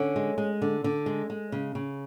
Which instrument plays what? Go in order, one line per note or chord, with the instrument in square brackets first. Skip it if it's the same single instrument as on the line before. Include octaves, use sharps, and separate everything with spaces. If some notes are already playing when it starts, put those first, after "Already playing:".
Already playing: [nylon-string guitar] D3 C#4
G#3
G#3
D3
D3
G#3
G#3
C#3
C#3